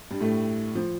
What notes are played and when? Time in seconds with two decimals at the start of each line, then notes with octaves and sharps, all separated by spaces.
0.11 G2 G3
0.20 A2 A3
0.75 F3